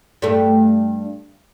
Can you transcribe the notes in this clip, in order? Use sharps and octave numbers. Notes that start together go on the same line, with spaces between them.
G2 A3